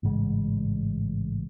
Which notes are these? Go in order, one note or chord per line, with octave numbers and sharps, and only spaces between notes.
A1 G#2 C#3 G#3